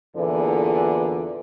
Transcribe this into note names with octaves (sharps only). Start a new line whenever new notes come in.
E2 A#2 D3 E3